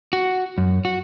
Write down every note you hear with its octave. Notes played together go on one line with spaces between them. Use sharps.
F#4
F#2
F#4